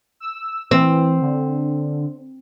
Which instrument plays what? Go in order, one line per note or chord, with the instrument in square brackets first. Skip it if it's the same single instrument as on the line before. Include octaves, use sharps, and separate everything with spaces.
[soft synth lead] E6
[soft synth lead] E3 [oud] C4
[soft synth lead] D3